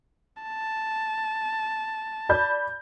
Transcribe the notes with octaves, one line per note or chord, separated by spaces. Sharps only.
A5
D5 B5 G6